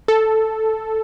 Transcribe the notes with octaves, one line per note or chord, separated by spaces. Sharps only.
A4